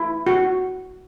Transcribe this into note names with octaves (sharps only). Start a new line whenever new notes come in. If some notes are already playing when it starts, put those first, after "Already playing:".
Already playing: E4
F#4